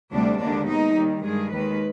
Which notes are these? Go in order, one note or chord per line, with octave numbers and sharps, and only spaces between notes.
D2 C3 G3 D4
D#2 D3 G#3 D4
B2 G#3 D#4
D#2 D#3 G3
G2 D#3 G#3 G#4
D#2 D#3 G#3 B4